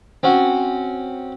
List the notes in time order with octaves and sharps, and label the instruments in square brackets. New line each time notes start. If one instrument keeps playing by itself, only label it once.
[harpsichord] C4 C#4 F#4